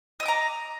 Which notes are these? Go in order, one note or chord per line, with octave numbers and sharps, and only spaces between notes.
D#5 A#5 D6 E6